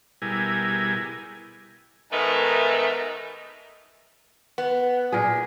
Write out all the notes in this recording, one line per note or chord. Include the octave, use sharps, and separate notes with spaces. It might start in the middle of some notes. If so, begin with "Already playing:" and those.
B2 G3 E4 G#4 A#4 G#5
G#2 D#3 A3 B3
B3
A#2 G#4